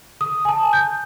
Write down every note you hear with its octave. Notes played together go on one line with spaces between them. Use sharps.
D#6
G#5 A5
G6